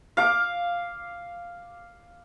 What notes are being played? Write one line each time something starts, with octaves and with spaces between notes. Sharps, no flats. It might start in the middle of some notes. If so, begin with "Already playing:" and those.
F5 D6